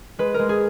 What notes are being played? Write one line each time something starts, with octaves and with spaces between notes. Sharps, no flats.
G#3 B4
G#3 A#4
G#4